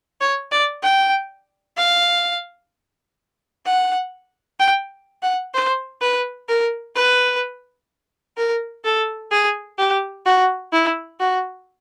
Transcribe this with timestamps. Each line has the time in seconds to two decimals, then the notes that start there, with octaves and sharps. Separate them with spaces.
0.21 C#5
0.52 D5
0.83 G5
1.77 F5
3.66 F#5
4.60 G5
5.23 F#5
5.54 C5
6.02 B4
6.49 A#4
6.96 B4
8.37 A#4
8.84 A4
9.32 G#4
9.78 G4
10.26 F#4
10.73 E4
11.20 F#4